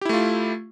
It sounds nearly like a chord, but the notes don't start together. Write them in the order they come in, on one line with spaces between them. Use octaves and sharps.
G4 E4 A3 F4